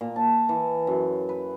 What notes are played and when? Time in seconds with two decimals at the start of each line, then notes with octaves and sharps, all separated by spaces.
0.01 A#2
0.16 A5
0.49 E3
0.87 F#2
1.29 B4